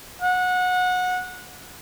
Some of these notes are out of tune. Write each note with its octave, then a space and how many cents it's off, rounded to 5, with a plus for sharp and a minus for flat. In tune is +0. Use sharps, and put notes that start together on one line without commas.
F#5 -20